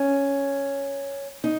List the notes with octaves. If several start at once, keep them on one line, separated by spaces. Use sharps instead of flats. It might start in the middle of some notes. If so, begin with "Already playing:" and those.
Already playing: C#4
D#4